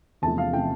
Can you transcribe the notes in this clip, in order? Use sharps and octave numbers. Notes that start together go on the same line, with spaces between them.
E2 C3 F3 A3 A5
F5
C3 F3 A3 G5